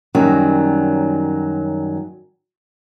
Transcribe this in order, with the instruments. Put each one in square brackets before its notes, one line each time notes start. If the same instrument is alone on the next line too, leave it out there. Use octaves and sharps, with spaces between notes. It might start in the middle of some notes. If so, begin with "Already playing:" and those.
[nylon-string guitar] F#2 D#3 F#3 G3